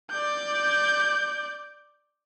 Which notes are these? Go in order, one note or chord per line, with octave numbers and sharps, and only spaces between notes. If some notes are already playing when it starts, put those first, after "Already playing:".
D5 G6